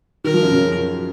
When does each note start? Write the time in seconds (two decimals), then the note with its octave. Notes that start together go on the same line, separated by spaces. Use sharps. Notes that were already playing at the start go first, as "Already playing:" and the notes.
0.24 D#3 A#4
0.34 F3
0.42 F#2 F#3
0.51 C#3 C#4